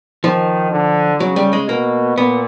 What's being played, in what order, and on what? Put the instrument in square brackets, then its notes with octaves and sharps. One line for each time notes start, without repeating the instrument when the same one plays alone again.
[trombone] D#3 [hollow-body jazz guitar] F3
[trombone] D3
[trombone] C#3 [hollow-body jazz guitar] F#3
[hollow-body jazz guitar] G3
G#3
[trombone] B2 [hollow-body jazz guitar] A#3
[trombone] A#2 [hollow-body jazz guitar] B3